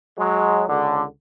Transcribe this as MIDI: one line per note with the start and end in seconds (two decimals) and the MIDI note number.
0.19 0.64 54
0.19 0.64 56
0.69 1.03 37
0.69 1.03 50